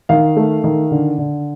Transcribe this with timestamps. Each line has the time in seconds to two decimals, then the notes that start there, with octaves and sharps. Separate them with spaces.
0.09 D#3 F5
0.37 A3
0.64 D#3
0.91 D3
1.18 D3